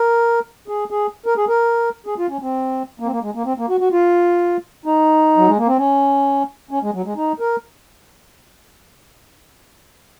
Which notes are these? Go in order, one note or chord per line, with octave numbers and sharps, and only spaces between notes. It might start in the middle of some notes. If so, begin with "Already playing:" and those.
Already playing: A#4
G#4
G#4
A#4
G#4
A#4
G#4
F4
C#4
C4
A#3
C4
A#3
G#3
A#3
C4
A#3
F#4
F#4
F4
D#4
F#3
G#3
A#3
C4
C#4
C#4
G#3
F#3
G#3
D#4
A#4